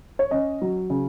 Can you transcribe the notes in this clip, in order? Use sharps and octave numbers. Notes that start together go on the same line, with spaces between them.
C#5
C#4 D#5
F#3
C#3